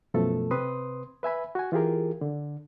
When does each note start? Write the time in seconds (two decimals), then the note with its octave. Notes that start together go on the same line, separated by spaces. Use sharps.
0.14 F#2 B2 F3 A3 A4
0.51 C3 C4 B4 C6 D#6
1.23 B4 E5 G#5 B5
1.55 F#4 G#5
1.72 E3 F4 G4 G#4 A#4
2.21 D3